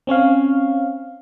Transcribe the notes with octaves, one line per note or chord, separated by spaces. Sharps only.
C4 C#4 C#5 F5